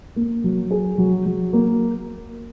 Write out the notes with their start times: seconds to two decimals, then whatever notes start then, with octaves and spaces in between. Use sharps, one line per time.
0.16 A#3
0.44 F#3
0.71 G#4
0.98 F#3
1.26 F#3
1.53 A#3